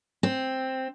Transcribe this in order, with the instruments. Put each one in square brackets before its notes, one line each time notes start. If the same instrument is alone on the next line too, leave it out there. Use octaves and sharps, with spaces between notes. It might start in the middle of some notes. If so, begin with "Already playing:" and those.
[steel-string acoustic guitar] C4